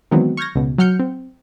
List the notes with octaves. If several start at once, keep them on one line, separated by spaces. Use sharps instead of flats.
D#3 E3 F#3 G#3 B3 C4
C#6 F6 G6 G#6 A#6
C#2 B2
F#3 F#5 F6 G6 C#7
C4